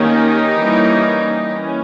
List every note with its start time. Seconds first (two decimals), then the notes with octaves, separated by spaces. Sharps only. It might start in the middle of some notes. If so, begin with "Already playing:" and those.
Already playing: D#3 A#3 C#4 D#4 G4
0.55 E3 G3 A#3 C#4
1.44 E3 A#3 C#4